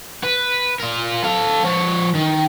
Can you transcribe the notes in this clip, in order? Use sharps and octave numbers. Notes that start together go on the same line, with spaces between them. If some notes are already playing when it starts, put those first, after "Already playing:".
B4
F4 A#4
A4 F5
F3 C#5
D#3